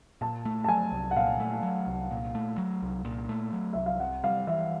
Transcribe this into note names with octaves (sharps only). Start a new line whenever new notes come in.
A#2 A5
A3
A5
F#3 G#5
C2
F#5
A#2 F5
A3
F#3
C2
A#2
A3
F#3
C2
A#2
A3
F#3
C2 E5
F5
C3 F#5
G3 F5
E3 E5